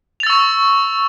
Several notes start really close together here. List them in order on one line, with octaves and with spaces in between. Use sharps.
F7 A6 E6 C#6